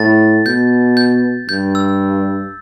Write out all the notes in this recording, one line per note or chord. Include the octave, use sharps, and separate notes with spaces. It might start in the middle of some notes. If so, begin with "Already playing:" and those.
Already playing: A2 A6
B2 G6
G6
G2 G6
E6